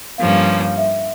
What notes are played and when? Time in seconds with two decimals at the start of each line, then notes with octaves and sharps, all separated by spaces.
0.18 G2 F3 A#3 C#4 F5
0.78 E5